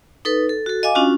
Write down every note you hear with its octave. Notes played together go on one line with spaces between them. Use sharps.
D#4 A4 B4
A4
F#4 A4
D#5 F5 G#5 D6
C#4 D4 F4 F#4